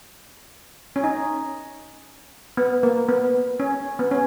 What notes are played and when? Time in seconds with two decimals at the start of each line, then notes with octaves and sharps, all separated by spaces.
0.96 C#4
1.04 D#4
2.57 B3
2.83 A#3
3.09 B3
3.60 C#4
3.99 B3
4.11 C#4